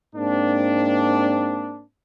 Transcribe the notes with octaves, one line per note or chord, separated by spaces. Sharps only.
G#2 A#3 C4 D4